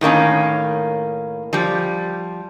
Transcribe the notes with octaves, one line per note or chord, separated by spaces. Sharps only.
A2 D#3 A#3 C#4
F3 G3